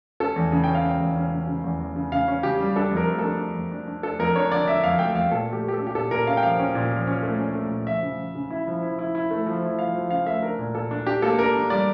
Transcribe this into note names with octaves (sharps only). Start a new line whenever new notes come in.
C#4 A4
E2
C#3
C#4 G5
F5
C#4 G5
E2
C#4
C#3
C#3
E2
E2
C#3
C#3 F5
C#4
C#3 G4
G3
D4 A4
F2
A#4
A3
A4
D4
D4
F2
D4
D4
D4 A4
F2 A#4
D4 C#5
D3 D5
D3 E5
F2 F5
A3 G5
F2 F5
A#2 A4
A3
G4
A3
G4
A4
C#4
G4
A#2 A4
A#2 A#4
C#4 F5
G5
F3 F5
C#4
A#2
F3
C#4
A3
C#4
A3
A#2
F3 E5
C#3
F3
C#3
E4
F3
E4
E4
E4
A3
F3
E4
F3 F5
F3
C#3 F5
A3 E5
D4 A#4
A#2
A#2 A4
D4
D4 G4
A#3 A4
D4 A#4
D4
G3 D5